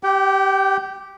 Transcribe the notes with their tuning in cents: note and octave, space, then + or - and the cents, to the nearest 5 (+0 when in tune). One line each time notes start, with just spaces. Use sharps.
G4 -5 G5 -40